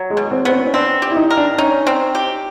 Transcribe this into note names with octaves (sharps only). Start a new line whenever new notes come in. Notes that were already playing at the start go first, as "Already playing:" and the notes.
Already playing: F#3
G#3
B2
C4
B3 C4
C#4
C#4
C4 D4
G4
E4
D#4
A#4
D4
C#4 D#4
C4
G4